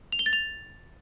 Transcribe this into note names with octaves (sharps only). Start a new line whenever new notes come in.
F7
G7
A6
F7